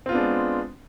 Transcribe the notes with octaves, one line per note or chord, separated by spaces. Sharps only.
G#3 B3 C4 D4 F4